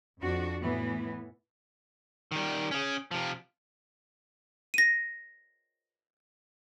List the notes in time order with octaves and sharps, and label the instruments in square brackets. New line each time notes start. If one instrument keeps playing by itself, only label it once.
[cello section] F2 D4 F#4
A2 E3 B3
[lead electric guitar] D#3 G3
C#4 G#4
C3 F3
[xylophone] A#6 D#7